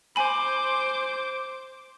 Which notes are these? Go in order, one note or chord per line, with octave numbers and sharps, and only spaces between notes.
C5 G#5 B5 D6